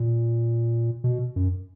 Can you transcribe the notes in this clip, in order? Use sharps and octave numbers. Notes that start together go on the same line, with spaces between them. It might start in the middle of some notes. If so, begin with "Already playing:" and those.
Already playing: A#2
B2
F#2